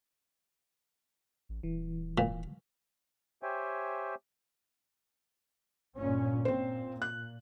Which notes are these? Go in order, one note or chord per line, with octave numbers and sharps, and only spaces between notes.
A1
D#1 E3
A#2
G4 C5 C#5 E5 G5 G#5
G1 A#2 C#4
A#2 C4 C5
F#6